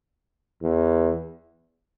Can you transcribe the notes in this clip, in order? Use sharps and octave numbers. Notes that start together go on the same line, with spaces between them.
E2